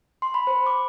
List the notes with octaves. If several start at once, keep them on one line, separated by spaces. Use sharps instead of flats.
C6
B5
C5
D6